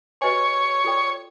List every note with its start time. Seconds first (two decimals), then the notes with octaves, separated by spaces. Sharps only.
0.21 F#4 B4 C#5 D#5 G#5 C6
0.84 F4 A4 D5 G5